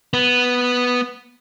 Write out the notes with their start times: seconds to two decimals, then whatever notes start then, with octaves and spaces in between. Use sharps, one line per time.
0.14 B3